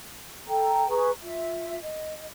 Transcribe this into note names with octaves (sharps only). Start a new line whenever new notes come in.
A4 G5 A#5
G#4 B4 A#5 C#6
F4 E5
D#5